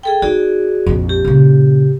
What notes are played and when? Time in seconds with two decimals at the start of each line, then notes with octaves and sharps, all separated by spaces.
0.03 G#4 A4 G5
0.22 D#4 F#4 G#4 D5
0.86 A#1 F2
1.09 G4
1.25 A#2 C#3